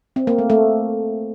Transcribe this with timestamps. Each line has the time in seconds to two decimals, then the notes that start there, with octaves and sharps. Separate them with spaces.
0.16 C4
0.27 A#3
0.38 A3
0.50 A3